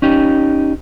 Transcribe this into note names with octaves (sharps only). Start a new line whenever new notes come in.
C#4 D#4 G4